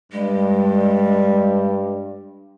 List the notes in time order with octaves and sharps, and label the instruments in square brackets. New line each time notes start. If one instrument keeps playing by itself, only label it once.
[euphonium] G2 [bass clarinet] G3 [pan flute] G#3